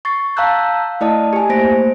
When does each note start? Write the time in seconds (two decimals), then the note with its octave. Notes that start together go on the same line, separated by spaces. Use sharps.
0.05 C#6 A6 C7
0.36 F5 A5 A#5 E6 F#6 G6
1.01 A3 E4 D5 D#5 A5 D#6
1.33 G4 G#5
1.49 A3 A#3 C5 A#6 D7